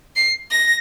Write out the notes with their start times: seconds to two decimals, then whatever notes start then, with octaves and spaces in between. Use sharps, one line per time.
0.16 C7
0.50 A#6